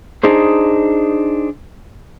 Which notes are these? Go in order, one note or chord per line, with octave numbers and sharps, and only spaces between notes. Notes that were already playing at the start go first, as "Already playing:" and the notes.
D4 D#4 G#4 C5